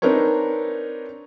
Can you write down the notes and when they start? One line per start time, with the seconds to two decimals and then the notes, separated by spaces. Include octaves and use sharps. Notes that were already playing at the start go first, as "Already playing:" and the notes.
0.02 C4 D4 D#4 A#4 B4 C#5